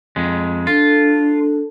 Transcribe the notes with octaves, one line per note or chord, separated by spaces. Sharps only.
F2 G#3
D4 F4 A4